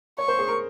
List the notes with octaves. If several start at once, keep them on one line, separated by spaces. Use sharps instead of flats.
C#5 C#6
C5
G#4
A#4